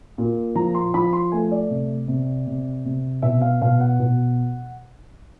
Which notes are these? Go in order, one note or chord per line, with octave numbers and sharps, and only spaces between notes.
A#2
F3 A#5
C6
F3 B5
C6
A3 G#5
D5
C3
C3
C3
C3
B2 E5
F5
B2 F5
F#5
B2